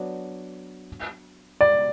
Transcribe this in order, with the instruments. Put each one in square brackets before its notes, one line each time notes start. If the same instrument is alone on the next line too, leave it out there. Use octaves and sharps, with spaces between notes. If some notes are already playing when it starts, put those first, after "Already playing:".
Already playing: [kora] F#3 B3 D4
[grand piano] D5